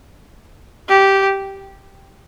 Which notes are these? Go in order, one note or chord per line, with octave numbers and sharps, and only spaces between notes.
G4